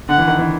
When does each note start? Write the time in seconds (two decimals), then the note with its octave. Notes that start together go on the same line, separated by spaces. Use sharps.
0.09 D3 F#5
0.18 E3
0.28 D#3
0.39 E3